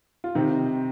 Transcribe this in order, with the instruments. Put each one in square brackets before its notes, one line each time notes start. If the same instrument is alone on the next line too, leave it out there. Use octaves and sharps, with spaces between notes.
[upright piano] F4
C3 D#3 C4 D#4